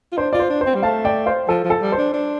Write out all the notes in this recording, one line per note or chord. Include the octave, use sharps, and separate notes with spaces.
F4
D4 C5
F4 D5
C5
D4
C5
C4
G3
A3 F5 A5
D5 G5
C5 F5
F3 A4
F3
A4
G3
C5
D4
D4